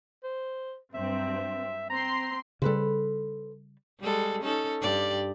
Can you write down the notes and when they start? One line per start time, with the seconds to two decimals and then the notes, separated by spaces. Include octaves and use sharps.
0.24 C5
0.94 G2 F#3 C4 E5
1.90 C4 A#5 C6
2.62 C#3 G3 A4 B4 C5
4.00 G3 G#3 A4
4.42 C#4 D#4 A4
4.81 G2 G4 D5